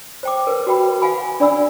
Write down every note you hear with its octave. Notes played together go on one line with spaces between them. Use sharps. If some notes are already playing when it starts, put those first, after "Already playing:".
C5 G5 D6
A#4 B4
F#4 B4 G5 B5
F5 F#5 G#5 B5
D4 D5 F#5 B5 E6